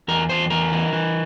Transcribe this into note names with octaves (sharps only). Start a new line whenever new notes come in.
E2 A#4
E2 C5
E2 A#4
E3
E3